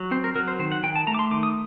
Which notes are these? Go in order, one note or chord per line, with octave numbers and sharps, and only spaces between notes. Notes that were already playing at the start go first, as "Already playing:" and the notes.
Already playing: F#3
C4 C5
A#4
F#3 A#4
C5
D#3 C5
F#5
D#3 G5
A5
A3 A#5
D6
C6
D#3 D6
D#6